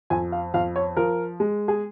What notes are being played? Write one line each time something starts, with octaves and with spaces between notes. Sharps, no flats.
F2 G#5
F5
F2 F5
C#5
F3 A#4
G#3
G#4